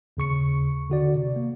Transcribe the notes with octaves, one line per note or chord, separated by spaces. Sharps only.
D#2 C#3 C#6 C#7
D3 F#4 D5
C3
A#3